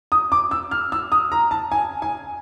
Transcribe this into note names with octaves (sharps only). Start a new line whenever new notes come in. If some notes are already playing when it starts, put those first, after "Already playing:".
D#6
D6
E6
F6
E6
D#6
A#5
A5
G#5
G#5